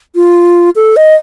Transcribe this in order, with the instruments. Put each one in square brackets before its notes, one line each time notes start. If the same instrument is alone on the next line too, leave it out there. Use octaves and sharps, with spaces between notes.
[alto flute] F4
A4
D#5